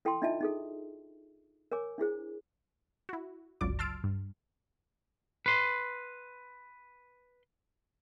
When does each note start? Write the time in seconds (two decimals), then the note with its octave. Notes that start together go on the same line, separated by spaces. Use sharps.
0.05 E4 A4 G5 A5 B5 C6
0.22 D4 D#4 F4 D#5 E5 A5
0.41 D#4 G#4 A4
1.72 A#4 C#5 G#5 D6
1.98 D4 E4 G#4 C5
3.09 E4 F#4
3.61 G1 C#2 F#3 F4 D5 D6
3.79 A5 C6 E6 F6 A6 D7
4.04 G2
5.46 B4 C6